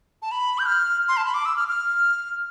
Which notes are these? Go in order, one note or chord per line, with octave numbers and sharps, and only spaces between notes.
A5
B5
G6
F6
C6
A5
B5
D6
E6
F6
F6